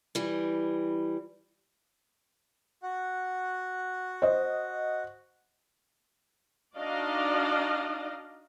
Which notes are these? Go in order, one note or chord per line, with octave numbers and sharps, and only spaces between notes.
E3 G3
F#4 F#5
C5 D#5
D4 D#4 F#4 D5 D#5 F5